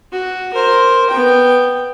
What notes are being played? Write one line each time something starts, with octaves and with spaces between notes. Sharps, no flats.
F#4
A#4 C5
B3 G5